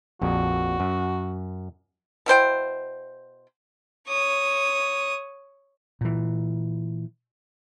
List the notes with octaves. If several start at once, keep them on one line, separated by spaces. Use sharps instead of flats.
A#1 F2 F#4
F#2
B2 E4 C5 G5
C#5 D#6
A#2 E3